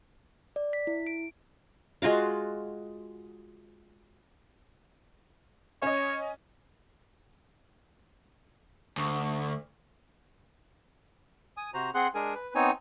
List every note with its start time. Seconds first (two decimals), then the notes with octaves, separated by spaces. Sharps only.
0.56 D5
0.73 B6
0.87 E4
1.07 D7
2.02 G#3 F4 F#4 F5
5.82 C#4 C#5 D#5
8.97 D2
11.57 G#5 D#6
11.74 C3 F#4 C5 A#5
11.95 C4 G#4 F#5 C6 F#6
12.15 G#3 D4 G#4 A#4 G#5
12.34 B4
12.55 B3 C4 D#4 C#5 G#5